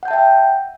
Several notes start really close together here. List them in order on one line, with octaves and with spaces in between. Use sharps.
F#5 G6 A5 E5 G5